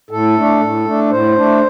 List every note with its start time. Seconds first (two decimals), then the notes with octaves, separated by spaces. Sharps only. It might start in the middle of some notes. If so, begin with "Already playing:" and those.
0.10 A2 A4
0.36 A3 D4
0.60 A2
0.85 A3 D4
1.10 A2 C5
1.35 A3 D4